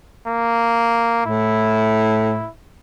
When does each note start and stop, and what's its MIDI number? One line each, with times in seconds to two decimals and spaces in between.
0.28 1.23 58
1.26 2.45 45
1.26 2.50 64